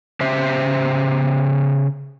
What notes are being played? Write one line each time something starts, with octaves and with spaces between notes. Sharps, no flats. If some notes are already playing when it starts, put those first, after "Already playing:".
C#3 G4 C5 E5